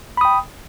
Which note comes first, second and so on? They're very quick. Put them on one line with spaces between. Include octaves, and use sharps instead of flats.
B5 D#6 G5